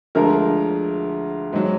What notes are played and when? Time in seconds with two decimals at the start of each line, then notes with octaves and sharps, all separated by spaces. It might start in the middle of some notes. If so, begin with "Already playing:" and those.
0.15 D2 D3 F3 G#3 A#4
1.53 G#2 F#3